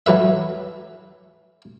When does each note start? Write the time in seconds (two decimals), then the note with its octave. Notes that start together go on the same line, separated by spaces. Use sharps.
0.06 E3 F#3 B4 E5